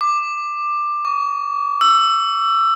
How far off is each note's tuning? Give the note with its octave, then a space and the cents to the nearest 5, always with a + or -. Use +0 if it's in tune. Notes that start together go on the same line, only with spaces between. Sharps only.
D6 +15
C#6 +45
E6 +20